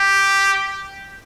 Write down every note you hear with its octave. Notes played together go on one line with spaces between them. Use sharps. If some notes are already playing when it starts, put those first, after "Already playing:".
Already playing: G4